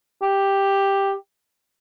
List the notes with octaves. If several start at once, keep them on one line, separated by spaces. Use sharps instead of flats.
G4